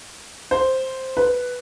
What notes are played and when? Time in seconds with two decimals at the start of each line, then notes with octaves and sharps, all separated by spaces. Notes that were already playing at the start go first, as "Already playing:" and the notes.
0.51 C5
1.17 B4